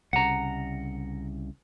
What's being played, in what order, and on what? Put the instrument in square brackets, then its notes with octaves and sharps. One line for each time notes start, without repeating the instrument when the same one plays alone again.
[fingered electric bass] C2 C#3 [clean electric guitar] F#5 A#5